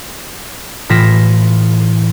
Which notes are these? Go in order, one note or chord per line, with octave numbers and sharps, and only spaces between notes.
A2 E3 F4 A#6 B6 E7